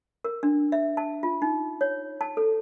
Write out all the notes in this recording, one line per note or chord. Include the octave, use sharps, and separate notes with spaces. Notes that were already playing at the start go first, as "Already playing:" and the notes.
A#4
D4
E5
A5
F4
D#4
C#5
A5
A4